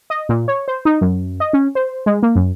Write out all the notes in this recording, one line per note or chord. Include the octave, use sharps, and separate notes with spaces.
D#5
A#2
C#5
C5
D#4
F#2
D#5
C#4
C5
G#3
A#3
F#2